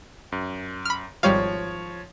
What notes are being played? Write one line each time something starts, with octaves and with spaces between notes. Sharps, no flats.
F#2
B5 F6
G#1 F3 G3 C#5 F5